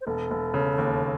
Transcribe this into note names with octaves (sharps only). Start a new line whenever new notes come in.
C5
E1 A4
E1
C#3
D#2